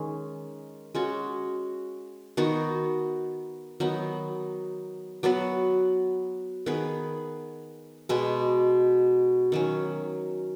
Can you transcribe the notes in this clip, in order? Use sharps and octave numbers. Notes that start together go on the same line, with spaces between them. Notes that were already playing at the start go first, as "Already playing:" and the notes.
Already playing: D#3 G#3 C#4
G#3 C#4 F#4
D#3 B3 D#4 F#4
D#3 F#3 B3 D#4
F#3 B3 F#4 B4
D#3 B3 G#4 B4
B2 G#3 B3
D#3 F#3 C#4